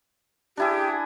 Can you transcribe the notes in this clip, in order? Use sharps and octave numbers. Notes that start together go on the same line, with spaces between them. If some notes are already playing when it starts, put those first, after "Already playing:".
D4 E4 G4 G#4